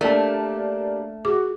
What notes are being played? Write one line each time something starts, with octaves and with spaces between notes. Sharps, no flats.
A3 A#3 D4 G4 D5 A5
F#4 G#4 D6